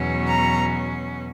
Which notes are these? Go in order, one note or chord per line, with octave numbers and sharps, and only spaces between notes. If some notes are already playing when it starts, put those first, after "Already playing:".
Already playing: E2 B2 F#3 C#4
A#5